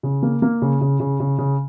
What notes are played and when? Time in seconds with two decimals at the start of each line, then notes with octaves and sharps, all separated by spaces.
0.03 C#3
0.23 A#3
0.42 A#3
0.62 C#3
0.81 C#3
1.00 C#3
1.20 C#3
1.38 C#3